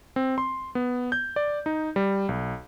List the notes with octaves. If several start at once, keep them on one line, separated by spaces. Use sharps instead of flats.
C4
C6
B3
G6
D5
D#4
G3
B1